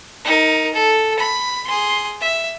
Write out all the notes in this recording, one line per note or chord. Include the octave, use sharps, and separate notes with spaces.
D#4 A#4
A4
B5
G#4 C6
E5